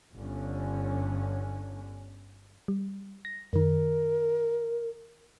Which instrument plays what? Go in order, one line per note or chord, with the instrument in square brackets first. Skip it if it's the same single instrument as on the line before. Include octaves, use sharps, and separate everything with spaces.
[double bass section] G1 D3 C#4
[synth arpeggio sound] G3
A#6
[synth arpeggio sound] F#2 D#3 [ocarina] A#4